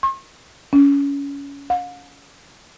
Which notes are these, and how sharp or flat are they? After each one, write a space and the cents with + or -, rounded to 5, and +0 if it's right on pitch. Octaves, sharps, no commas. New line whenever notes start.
C#6 -45
C#4 +25
F5 +45